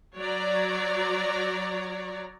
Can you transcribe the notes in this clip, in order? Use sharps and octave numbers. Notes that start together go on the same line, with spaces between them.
F#3 C#5 D5 A#5